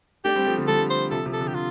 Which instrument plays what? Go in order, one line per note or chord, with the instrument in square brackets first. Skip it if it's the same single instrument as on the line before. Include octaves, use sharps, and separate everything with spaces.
[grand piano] A3 D4 [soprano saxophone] G4
[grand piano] G3 C4
F3 A3
D3 G3
[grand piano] D3 G3 [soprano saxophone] A4
[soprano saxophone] C5
[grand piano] C3 F3 [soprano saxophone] A4
[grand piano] C3 F3
[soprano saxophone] A4
[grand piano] D3
[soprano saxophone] G4
[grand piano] C3 [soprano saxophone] F4